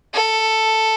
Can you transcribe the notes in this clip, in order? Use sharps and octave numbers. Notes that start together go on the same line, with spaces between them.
A4